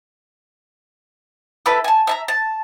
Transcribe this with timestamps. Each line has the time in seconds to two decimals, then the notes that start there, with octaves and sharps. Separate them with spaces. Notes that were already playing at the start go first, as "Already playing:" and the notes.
1.66 E4 A4 B4
1.84 G#5 A5
2.07 E5 A5 A#5
2.28 A5